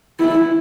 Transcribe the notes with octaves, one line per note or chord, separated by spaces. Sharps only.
E4